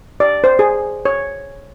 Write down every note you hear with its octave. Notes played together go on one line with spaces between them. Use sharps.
D5
C5
G#4
C#5